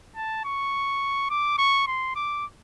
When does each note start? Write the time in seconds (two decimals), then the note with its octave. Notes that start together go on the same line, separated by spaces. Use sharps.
0.16 A5
0.45 C#6
1.30 D6
1.58 C#6
1.87 C6
2.15 D6